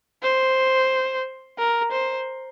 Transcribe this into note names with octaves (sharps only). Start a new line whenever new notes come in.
C5
A#4
C5